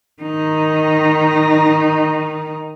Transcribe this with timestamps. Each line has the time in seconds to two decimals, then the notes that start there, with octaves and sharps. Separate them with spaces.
0.23 D#3 D#4